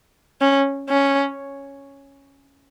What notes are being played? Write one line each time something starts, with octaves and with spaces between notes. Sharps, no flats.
C#4
C#4